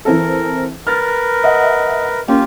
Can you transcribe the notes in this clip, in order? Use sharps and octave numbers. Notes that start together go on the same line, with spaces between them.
E3 C4 A4 A#4
A#4 B4 F6 A6
D#5 E5 F#5
A#3 C#4 F4 G4